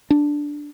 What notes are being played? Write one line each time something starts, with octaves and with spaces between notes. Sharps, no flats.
D4